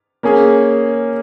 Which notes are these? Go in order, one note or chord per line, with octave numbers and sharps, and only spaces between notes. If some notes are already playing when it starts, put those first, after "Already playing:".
A#3 C#4 G#4